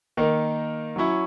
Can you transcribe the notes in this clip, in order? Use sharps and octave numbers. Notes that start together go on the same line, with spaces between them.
D#3 A#3 D#4 A#4
F#3 C#4 E4